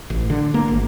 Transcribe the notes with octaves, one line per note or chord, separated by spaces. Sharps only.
A1
D3
A#3
G#1